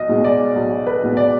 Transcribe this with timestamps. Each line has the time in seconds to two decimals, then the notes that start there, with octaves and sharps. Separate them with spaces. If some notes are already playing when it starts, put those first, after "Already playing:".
Already playing: B1 D#5
0.09 B2 G#3
0.24 D5
0.55 B1
0.87 B4
1.02 B2 G#3
1.17 D5